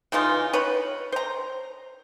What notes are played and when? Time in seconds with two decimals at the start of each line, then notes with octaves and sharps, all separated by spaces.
0.12 C#3 E3 D#4 F4
0.53 B4 C#5 B5
1.12 C5 A#5